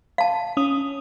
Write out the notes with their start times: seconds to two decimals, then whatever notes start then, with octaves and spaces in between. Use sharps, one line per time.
0.18 F5 A5
0.57 C#4 D#6